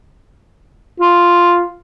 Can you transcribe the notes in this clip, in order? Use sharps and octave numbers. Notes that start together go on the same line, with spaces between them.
F4